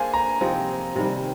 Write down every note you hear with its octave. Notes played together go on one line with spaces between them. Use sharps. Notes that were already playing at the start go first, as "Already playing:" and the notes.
Already playing: A#3 D4 G#4 C5 G#5
A#5
C3 F3 C4 D#4
C3 D#3 G3